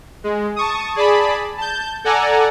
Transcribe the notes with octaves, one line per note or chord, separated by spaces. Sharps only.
G#3
A5 C#6 D#6
G#4 D5 A5 B5
A5 G6
A4 D5 F#5 G#5 A#5